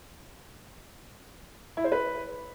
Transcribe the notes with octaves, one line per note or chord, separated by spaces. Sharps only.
E4
C5
B4